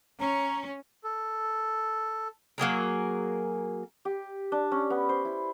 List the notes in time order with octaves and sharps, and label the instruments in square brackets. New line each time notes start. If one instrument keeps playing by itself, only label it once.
[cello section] C#4 [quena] A#5
[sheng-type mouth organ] A4
[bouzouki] F#3 A#3 G#4 A#4
[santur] G4
D4
C#4
B3
C5
E4